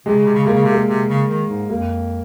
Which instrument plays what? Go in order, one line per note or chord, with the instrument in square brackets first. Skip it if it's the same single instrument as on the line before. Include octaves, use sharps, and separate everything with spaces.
[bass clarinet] C3 [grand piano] G#3
[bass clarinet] C#3
C3
C#3
[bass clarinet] C3 [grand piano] A#3
[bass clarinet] C#3
C3
[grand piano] A#3
[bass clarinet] C3
C#3
D#3
G#2
[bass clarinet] F2 [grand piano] A#3